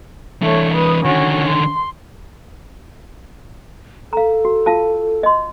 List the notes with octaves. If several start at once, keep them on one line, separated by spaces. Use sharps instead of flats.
E3 A3 D4 C#5
B4 D#6
D3 D#3 C#4 F#4
C6
A4 F5 A#5
F#4
F4 F5 A5
D#5 C6